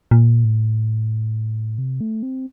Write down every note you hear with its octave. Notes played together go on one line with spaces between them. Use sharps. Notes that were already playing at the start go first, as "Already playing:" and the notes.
A#2
A2
C3
A3
C4